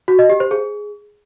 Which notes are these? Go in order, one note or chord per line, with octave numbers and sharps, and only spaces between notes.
F#4
D#5
G4
C5
G#4